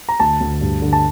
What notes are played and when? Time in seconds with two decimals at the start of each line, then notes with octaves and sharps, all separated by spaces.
0.09 A#5
0.20 D2 A5
0.41 D2
0.61 G2
0.82 D3
0.93 A5